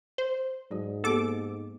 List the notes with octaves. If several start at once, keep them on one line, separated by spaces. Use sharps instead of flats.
C5
G#2 F#3 F#4
A#3 B3 G4 A4 D6